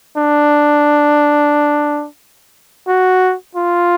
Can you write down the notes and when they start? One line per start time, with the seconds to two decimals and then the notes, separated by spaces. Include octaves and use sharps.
0.17 D4
2.87 F#4
3.55 F4